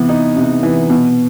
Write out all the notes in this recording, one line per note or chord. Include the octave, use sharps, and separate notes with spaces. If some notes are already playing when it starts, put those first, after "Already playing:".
Already playing: C3 E3 B3
D#4
C3
E3
B2